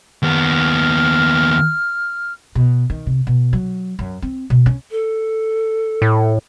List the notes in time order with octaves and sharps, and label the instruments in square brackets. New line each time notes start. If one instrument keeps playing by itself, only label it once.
[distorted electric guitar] D#2 B3 [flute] F6
[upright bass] B2
D#3
C3
B2
F#3
F#2
C4
B2
C#4
[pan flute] A4
[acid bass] A2